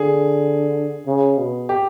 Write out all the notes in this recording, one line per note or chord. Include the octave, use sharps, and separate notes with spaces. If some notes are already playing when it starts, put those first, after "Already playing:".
Already playing: D3 G#4
C#3
B2
G4